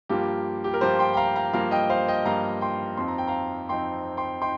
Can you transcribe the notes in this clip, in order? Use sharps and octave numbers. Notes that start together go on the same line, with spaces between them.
G2 F3 A#3 F4 G4
G4
A#4
G2 F3 A#3 F4 G4 C5
G5 C6
G5
F5 A#5
F5 A#5
G2 F3 A#3 F4 F5 A#5
D#5 G5
C5 F5
D#5 G5
G2 F3 A#3 F4 F5 A#5
G5 C6
F2 F3 C4 D#4 C6
A#5
G5
F5 A#5
F2 F3 C4 D#4 G5 C6
G5 C6
D#4 G5 C6